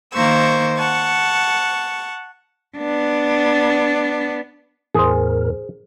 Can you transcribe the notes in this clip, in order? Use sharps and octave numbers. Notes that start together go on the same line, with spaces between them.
D#3 A#3 C5 C#6 E6
F#5 A5 C#6
B3 D4
E2 A2 G#4 A#4 C5